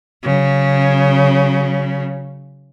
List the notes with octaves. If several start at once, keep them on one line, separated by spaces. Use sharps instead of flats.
C#3 F#3